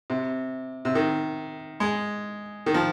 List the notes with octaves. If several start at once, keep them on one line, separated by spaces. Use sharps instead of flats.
C3
C3
D#3
G#3
D#3
F3